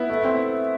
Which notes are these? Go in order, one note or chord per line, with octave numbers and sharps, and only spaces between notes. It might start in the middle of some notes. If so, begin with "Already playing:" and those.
Already playing: B3 E4
A3
C4